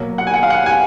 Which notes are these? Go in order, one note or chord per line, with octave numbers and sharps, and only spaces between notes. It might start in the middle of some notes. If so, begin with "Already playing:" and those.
Already playing: B2 F#3 A#3
F#5
G#5
F#5
F5
F#5
G#5